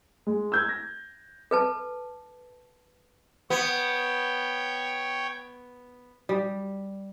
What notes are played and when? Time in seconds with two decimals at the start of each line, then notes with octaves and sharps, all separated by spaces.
0.27 G#3
0.52 E6 G6 G#6
0.69 A#6
1.51 A4 B4 A5
3.50 B3 C#5 G5
6.29 G3